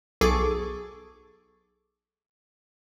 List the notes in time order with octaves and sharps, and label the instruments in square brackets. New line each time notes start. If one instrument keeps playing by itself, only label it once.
[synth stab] B1 G#4 A4 C#6 D6